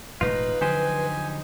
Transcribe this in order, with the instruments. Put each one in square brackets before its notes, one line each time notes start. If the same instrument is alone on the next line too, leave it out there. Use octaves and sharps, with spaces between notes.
[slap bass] E1 A2 G#3 [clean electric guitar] D#4 F4 [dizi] B4
[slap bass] D3 F3 F#3 [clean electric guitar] D#4 G4 C5 [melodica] G#5